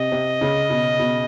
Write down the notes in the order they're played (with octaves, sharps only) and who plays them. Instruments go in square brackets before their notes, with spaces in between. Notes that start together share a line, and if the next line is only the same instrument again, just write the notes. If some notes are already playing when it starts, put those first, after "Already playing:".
Already playing: [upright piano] C3 [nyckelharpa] D#5
[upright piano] C3
C#3
B2
B2